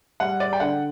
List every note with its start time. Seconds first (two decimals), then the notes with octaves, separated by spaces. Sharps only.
0.20 G3 F#5
0.40 D5
0.53 G5
0.60 D3 F#5